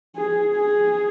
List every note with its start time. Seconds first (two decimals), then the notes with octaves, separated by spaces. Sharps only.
0.16 G#4
0.55 G#4